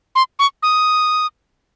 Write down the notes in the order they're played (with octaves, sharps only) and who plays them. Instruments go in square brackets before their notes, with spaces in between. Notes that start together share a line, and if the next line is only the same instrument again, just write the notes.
[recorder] C6
C#6
D#6